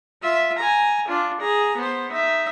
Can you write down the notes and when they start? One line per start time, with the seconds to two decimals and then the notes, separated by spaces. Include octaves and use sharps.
0.23 F4 E5
0.58 G#5 A#5
1.07 D4 F4
1.40 G#4 A#5
1.77 B3 C5
2.12 D#4 E5